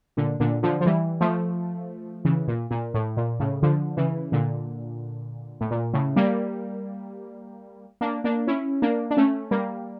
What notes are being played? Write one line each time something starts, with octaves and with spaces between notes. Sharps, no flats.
A#2 D3
A#2 D3
D3 F3
F3
E3 G3
F3 A3
C#3 E3
A#2
A#2
A2
A#2
A2 C#3
D3 F3
C#3 E3
A#2 D3
A2
A#2
A2 C#3
G3 A#3
A#3 D4
A#3 D4
C#4 E4
A#3 D4
D4
A3 C#4
G3 A#3